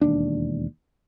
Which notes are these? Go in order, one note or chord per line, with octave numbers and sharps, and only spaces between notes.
E1 D#2 D4